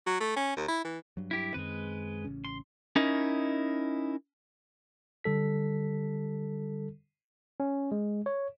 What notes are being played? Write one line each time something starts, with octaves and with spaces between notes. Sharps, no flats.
F#3
A3
C#4
D#2
E4
E3
G2 F#3
E4 G4
F#2 D#3 G#3 C4 B4
A1 C#3 C#4
C6
C#4 D#4 E4 A#4 D#5
D3 G3 A4 B6
C#4
G#3
C#5